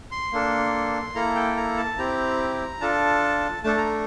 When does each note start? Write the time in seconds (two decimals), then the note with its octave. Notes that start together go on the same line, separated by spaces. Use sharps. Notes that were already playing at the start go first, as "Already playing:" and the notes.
0.11 C6
0.33 A#3 D4 A4
1.15 A#3 E4 A4 A#5
1.36 G5
1.57 A#5
1.77 A5
1.98 C4 E4 G4 A#5
2.81 D4 F4 A4 A5
3.64 A3 D4 A4 A5
3.77 A#5